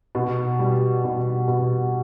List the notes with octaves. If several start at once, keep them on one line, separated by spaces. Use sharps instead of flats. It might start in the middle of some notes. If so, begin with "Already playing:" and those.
B2
G3
B2
B2